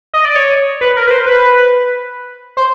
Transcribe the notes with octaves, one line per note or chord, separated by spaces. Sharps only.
D#5
D5
C#5
B4
A#4
B4
C5
B4
C5